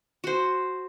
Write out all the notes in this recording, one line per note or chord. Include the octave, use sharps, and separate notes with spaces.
F#4 C5